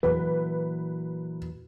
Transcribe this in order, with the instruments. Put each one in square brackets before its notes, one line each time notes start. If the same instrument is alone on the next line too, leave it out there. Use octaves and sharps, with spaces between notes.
[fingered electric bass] A#2 E3 F#3 [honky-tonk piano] B4